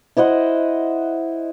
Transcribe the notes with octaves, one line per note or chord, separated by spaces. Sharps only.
E4 C5 D#5 F#5